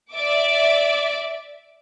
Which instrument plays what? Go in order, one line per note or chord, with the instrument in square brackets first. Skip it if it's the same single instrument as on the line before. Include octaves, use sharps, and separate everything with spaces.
[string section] D5 E5 D6